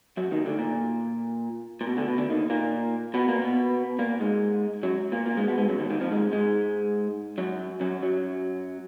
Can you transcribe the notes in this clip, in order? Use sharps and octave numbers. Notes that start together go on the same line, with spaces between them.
F#2 F#3
D#2 D#3
D2 D3
A#2
A#2
B2
D2 D3
B2
D2 D3
D#2 D#3
A#2 A#3
B2 B3
A#2 A#3
B2 B3
A#2 A#3
G#2 G#3
F#2 F#3
A#2 A#3
A#2 A#3
G#2 G#3
B2 B3
G#2 G#3
F#2 F#3
D#2 D#3
D#2 D#3
F2 F3
G#2 G#3
G#2 G#3
F#2 F#3
F#2 F#3
F#2 F#3